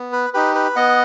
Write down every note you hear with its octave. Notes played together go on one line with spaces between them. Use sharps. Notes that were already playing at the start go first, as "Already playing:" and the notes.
Already playing: B3
B4
D#4 G4 B4
B4
B3 D#5 F#5